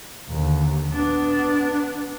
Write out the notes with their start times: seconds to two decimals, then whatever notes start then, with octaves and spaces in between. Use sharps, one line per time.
0.30 D#2 D3
0.91 B3 D4